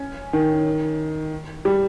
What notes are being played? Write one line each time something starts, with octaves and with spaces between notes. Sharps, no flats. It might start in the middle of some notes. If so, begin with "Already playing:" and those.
Already playing: C#4
D#3
G3